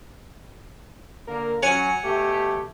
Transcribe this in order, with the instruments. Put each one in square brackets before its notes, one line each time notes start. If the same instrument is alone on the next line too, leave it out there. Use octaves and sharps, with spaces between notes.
[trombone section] D3 A#3 A#4
[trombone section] F#3 C#4 [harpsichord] C#5 F#5 G#5
[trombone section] B2 A3 G4